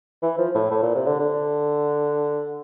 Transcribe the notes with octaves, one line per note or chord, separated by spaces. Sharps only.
E3
F3
A2
A2
A#2
C3
D3
D3